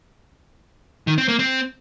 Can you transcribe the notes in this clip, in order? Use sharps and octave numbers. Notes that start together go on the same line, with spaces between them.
D#3
C4
A#3
C4